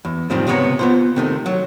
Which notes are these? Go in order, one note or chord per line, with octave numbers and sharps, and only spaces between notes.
E2
D#2 G#2 D#3 F3 G3 C4
C#2 C3 B3 C4 C#5 A#5
B3 F4 C5
C3 D#3 A3
F#3